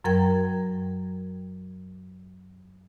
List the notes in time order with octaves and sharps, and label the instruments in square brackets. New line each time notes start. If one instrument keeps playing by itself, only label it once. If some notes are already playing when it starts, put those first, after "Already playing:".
[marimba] F#2 F#3 A#4 G5 G#6